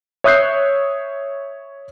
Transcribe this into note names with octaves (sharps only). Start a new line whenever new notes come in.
C#5 E5 D#6 F#6 G6 C7